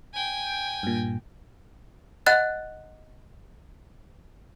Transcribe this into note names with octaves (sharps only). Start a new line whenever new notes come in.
G5 G#5
G2 A#2
D#5 F#5 F#6 A6